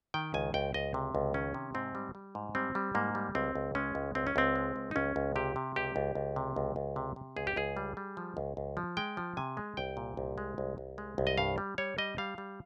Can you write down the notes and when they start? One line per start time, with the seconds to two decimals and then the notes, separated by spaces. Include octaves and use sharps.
0.14 D#3 G5
0.34 C#2 G#5
0.54 C#2 G5
0.74 C#2 D#5
0.94 C3
1.15 C#2
1.34 D#3 C#4
1.54 C3
1.74 G#2 C4
1.95 G3
2.15 G3
2.35 G#2
2.55 G3 C4
2.75 G3
2.95 G#2 A#3
3.15 G3
3.35 C#2 C4
3.55 C#2
3.75 G#3 C#4
3.95 C#2
4.15 C#2 C4
4.27 C#4
4.36 C#2 C4
4.56 G#3
4.76 C#2
4.91 D#4
4.96 C#2 C#4
5.16 C#2
5.36 C3 G4
5.56 C3
5.76 C#2 G4
5.96 C#2
6.15 C#2
6.36 C3
6.56 C#2
6.76 C#2
6.96 C3
7.16 C3
7.36 C#2 G#4
7.47 G4
7.56 C#2 G#4
7.77 G3
7.97 G3
8.17 F3
8.37 C#2
8.57 C#2
8.77 F3
8.97 G#3 G5
9.17 F3
9.37 C3 G#5
9.57 G#3
9.77 C2 G5
9.97 A#2
10.17 C2
10.38 G#3
10.58 C2
10.78 C2
10.98 G#3
11.18 C2
11.27 D#5
11.38 G2 F5
11.58 G3
11.78 G3 C#5
11.98 G3 D#5
12.18 G3 F5
12.38 G3